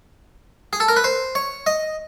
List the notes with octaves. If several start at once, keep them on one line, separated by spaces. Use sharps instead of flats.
G#4
A4
A#4
B4
C5
C#5
D#5